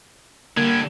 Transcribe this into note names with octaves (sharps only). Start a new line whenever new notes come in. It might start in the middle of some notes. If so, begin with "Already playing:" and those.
D3 G3 A#3 G#6